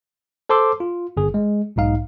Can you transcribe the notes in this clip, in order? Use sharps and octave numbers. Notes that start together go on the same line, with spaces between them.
A4 C5 A5 C6 D6 E6
F4
G1 G#4
G#3
B1 G#2 D#4 F5